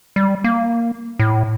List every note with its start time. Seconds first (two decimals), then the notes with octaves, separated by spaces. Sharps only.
0.16 G3
0.44 A#3
1.19 A2